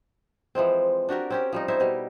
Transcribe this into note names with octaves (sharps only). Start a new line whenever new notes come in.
E3 F3 G#3 C4
D4 F#4 G4 A#4
C4 C#4 G4
F3 G3 D#4
D#4 E4 C5 E5
B2 G3